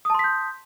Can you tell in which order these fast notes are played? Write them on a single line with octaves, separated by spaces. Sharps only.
D#6 A5 C6 B6 G6